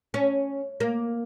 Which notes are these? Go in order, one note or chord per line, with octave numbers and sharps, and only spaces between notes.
C#4
A#3